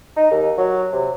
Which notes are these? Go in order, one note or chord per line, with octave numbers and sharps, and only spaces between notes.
D#4
D#2
F#3
C3